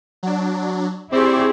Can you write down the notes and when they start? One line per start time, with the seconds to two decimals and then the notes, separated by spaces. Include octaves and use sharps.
0.23 F#3 D4
1.12 C4 E4 G4 G#4 D5 C6 C#6